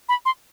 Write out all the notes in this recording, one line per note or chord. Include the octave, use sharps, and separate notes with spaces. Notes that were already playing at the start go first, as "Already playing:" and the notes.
B5
C6